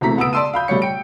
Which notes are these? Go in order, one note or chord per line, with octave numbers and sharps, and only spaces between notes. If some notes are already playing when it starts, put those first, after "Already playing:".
E1 C3 E3 A3 A#5 B6
C#2 B3 D#6 E6 D7
D5 A5 C6 E6 D#7
F5 B5 G6
B2 G3 A3 C#5 C#7
G5 D7